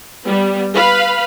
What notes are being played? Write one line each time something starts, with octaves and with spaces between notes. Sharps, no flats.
G3 B3
B4 F5 B5